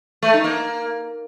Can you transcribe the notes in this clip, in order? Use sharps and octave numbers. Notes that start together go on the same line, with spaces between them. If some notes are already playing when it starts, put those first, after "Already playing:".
A3
D#4
A#3